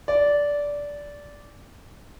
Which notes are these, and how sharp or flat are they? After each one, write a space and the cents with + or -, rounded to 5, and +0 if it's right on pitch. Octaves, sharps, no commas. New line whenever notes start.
D5 -15